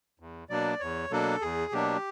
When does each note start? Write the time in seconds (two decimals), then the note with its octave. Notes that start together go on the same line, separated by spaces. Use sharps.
0.20 E2
0.49 B2 F#3 A#3 D4 D5
0.80 E2 C#5
1.11 B2 F#3 A#3 D4 A4
1.42 E2 G#4
1.72 B2 F#3 A#3 D4 G4